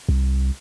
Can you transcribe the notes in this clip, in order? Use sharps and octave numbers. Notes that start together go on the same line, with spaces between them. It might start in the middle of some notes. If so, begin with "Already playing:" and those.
C2